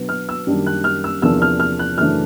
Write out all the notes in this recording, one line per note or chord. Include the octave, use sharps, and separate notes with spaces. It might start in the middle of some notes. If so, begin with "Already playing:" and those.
Already playing: B2 F#3 B3 D4
F6
E6
F#2 D#3 G3 A#3 D4
F#6
F6
E6
E2 C3 F3 A#3 D4 E6
F6
F6
F#6
F#2 C#3 E3 A3 D4 F6